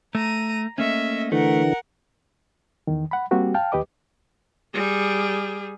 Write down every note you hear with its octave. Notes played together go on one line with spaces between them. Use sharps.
A3 A#5 D#7
A3 A#3 C#4 D#5 E5
D3 E3 A3 A#4 F#5
E2 D#3
F#5 B5
G3 A#3 C4 F#4 G4
F5 G5 A5 F6
D#2 G4 B4 D#5 D6
G3 G#4